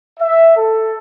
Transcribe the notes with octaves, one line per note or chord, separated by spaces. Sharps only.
E5
A4